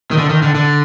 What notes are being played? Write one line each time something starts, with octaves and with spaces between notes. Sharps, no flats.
D#3
D3
D#3
D3
D3